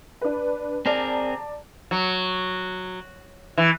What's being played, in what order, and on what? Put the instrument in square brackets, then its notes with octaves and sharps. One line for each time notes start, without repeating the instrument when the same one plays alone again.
[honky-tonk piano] D4 B4
[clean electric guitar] C4 G#4 A#4 [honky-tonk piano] D5 A5 A#5
[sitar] F#3
E3